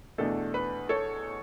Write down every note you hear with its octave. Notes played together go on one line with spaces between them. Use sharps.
E2 B2 A3 D4 A4
B4
A4 C#5